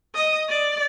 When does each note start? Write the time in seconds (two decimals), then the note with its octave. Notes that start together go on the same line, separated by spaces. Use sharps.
0.15 D#5
0.49 D5